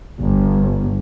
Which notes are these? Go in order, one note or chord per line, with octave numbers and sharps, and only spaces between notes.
G1